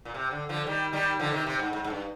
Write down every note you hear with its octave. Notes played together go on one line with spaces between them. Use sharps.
A#2
C3
D3
D3 F3
D#3 G3
D#3 G3
D3 F3
C3 D#3
C3
G#2
G#2
G#2
G2